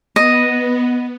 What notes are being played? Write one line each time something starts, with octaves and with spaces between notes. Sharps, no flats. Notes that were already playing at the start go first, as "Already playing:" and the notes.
B3 D#5